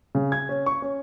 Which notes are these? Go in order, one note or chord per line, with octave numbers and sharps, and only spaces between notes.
C#3
G#6
C#4
C#6
C#4